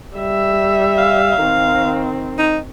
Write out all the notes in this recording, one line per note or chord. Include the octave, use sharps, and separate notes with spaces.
G3 E5
F5
D#3 C4
D#4